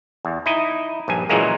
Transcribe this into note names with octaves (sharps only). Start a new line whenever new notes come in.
E2
D#4 E4 D#5
A#1 G2 G#5
A#2 C#3 E3 F#3 G#3 A#3